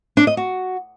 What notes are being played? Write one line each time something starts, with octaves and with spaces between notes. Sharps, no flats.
D4
D#5
F#4